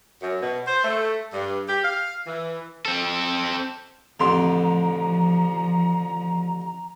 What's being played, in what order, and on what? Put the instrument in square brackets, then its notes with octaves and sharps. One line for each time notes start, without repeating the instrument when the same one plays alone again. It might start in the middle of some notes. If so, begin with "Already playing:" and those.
[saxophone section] F#2
B2
C5
A3
G2
G4
F5
E3
[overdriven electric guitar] C4 A4
[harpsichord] A1 D3 [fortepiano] F2 C6 [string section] F3 [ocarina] A#5